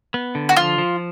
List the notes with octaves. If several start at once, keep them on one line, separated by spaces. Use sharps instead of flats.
B3
D3
F#4
F3 F4
F3